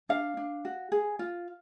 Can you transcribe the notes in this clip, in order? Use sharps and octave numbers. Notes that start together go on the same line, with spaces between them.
D4 F5
D4
F#4
G#4
F4